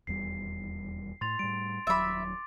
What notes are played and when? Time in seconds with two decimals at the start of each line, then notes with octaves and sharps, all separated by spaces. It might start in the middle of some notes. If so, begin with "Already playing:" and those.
0.07 D#1 E2 G3 C7
1.21 A2 C6 A6 F7
1.39 A2 G3 D7
1.87 D#1 F#3 E5 B5 D6 A6